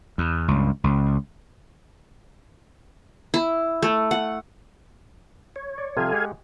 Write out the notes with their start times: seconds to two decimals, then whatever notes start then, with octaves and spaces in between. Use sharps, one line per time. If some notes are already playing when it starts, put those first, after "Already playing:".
0.18 E2
0.48 C#2 G2
0.84 C#2
3.34 E4
3.82 A3
4.11 F#5
5.56 C#5
5.78 D5
5.97 C3 F3 G3 A4 F5 G#5
6.13 G#3 G4 F#5